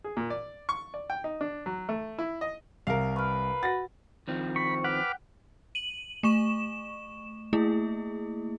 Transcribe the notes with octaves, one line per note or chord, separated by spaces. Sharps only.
G#4
A#2
D5
C#6
D5
G5
D#4
D4
F#3
A3
E4
D#5
C2 A#4 F5
B4 C#6 F6
F#4 F#5 A6 A#6
D#3 F3 C4
B5 C#6
B4 F#5 G5 D6 F6
D#7 F#7
A3 C#6 E7
A3 A#3 E4 G#4